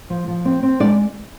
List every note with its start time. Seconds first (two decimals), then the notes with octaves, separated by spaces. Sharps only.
0.10 F3
0.28 F3
0.45 C4
0.63 C4
0.80 G#3 D4 D5